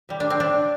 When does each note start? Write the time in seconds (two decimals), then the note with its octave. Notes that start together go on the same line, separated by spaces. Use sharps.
0.09 C3 G3
0.20 D4
0.30 C4
0.40 D4